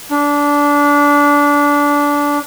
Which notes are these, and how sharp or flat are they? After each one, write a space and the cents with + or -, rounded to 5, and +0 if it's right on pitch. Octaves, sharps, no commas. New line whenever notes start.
D4 -20